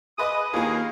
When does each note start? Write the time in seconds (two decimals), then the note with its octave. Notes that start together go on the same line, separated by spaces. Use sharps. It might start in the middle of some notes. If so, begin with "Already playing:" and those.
0.18 G#4 B4 D#5 D#6
0.53 D#2 A#3 E4 F4 G#4